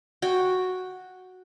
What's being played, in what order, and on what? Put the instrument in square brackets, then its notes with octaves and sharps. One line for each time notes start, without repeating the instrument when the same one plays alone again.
[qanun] F#4 G5